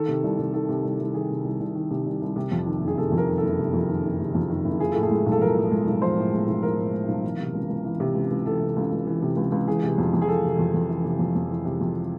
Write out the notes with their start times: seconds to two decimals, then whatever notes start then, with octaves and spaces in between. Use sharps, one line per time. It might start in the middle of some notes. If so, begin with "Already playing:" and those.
Already playing: D#3 A4
0.08 C3
0.23 C2
0.38 C2
0.53 D#3 A4
0.69 C3
0.84 C2
1.00 C2
1.14 D#3 G#4
1.30 C3
1.44 C2
1.60 C2
1.75 D#3
1.91 C3
2.06 C2
2.21 C2
2.36 C3
2.51 F2
2.66 D#3
2.81 F#1
2.88 G#4
2.98 C3 A4
3.12 F2
3.18 A#4
3.27 D#3
3.38 A4
3.43 F#1
3.58 C3
3.74 F2
3.88 D#3
4.04 F#1
4.19 C3
4.35 F2
4.50 D#3
4.65 F#1
4.80 F3 G#4
4.92 A2 A4
5.03 G#4
5.11 G#3
5.26 B1
5.32 A4
5.41 F3 A#4
5.57 A2
5.71 G#3
5.87 B1
6.02 F3 C5
6.18 A2
6.33 G#3
6.47 B1
6.63 F3 A#4
6.78 A2
6.93 G#3
7.08 B1
7.23 E3
7.38 C3
7.54 C#2
7.69 C#2
7.85 E3
8.00 C3
8.15 C#2
8.30 C#2
8.45 E3 A4
8.60 C3
8.76 C#2
8.92 C#2
9.07 E3
9.22 C3
9.36 C#2
9.52 C#2
9.68 E3 G#4
9.83 C3
9.98 F2
10.14 F2
10.22 G#4
10.28 E3 A4
10.43 C3
10.59 F2
10.74 F2
10.89 E3
11.04 C3
11.19 F2
11.35 F2
11.50 E3
11.65 C3
11.81 F2